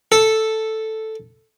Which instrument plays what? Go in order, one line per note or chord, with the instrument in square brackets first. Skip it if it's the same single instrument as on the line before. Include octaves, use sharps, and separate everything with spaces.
[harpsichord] A4